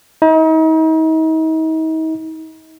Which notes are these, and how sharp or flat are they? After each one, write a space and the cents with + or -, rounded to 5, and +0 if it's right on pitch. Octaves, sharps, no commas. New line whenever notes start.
D#4 +40